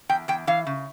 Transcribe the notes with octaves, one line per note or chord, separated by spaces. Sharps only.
E2 G5
E2 G5
E3 F5
C#3